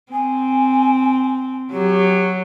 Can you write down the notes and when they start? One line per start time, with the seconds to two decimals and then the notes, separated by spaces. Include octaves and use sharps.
0.12 C4 G#5
1.72 F#3 G4